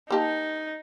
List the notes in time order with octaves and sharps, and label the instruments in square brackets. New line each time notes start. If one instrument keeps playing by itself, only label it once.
[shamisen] A#3 G4 A5 [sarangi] D#4